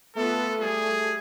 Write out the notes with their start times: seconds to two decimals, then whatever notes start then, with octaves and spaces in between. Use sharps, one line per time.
0.16 A3 B3 F4 A4
0.60 G3 G#4